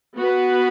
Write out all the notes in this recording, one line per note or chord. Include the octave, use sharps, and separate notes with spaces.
B3 F#4 B4